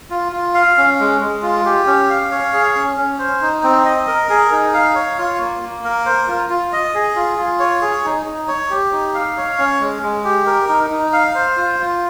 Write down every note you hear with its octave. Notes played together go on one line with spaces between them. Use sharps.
F4
F4
F5
C#4
G#3
G#3
F4
G4
C#4
F5
C#5
G#4
C#4
C#4
C5
D#4
C4
D#5
A#4
G#4
D#4
F5
C#5
F4
A#3
A#3
A#4
C5
F4
F4
D#5
G#4
F4
F4
C#5
G#4
D#4
D#4
C#5
G4
D#4
F5
C#5
C#4
G#3
G#3
G4
A#4
D#4
D#4
F5
C5
F4
F4